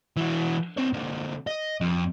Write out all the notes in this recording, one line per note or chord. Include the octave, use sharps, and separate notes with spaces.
E3 F#4
C4 C#5
D3 A#3
D#5
F2